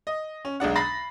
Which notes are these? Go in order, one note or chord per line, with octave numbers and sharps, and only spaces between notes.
D#5
C#4
B1 G#3 D4 F#5
B5 A6 A#6 C7